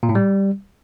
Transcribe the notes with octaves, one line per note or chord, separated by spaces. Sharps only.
A#2
A2
G3